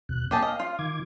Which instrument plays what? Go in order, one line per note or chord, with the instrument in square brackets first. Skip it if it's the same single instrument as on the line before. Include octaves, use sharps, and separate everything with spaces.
[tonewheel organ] D#2 B2 F#6
[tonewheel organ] A#3 [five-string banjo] G4 G#4 A5
[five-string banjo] D#5 [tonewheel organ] F5
[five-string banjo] F4
[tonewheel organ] D#3 D6 G#6